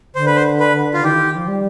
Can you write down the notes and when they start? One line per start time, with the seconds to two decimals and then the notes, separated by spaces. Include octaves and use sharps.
0.15 D3 C5
0.26 B4
0.36 C5
0.60 B4
0.94 F4
1.03 D#3 G4
1.14 D#3
1.25 D#3
1.36 F3
1.48 G3